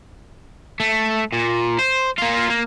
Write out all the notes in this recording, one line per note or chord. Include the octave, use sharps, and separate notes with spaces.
A3
A#2
C5
A#3 F4
A#3